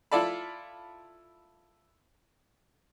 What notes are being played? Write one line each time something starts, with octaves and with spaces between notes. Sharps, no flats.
E4 F4 A4 D5 A5 B5